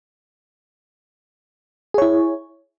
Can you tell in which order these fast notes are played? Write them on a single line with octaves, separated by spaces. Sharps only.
G#4 C#5 E4